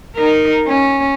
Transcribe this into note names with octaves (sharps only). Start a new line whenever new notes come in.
D#4 A#4
C#4